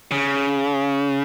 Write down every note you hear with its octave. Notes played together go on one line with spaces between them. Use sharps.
C#3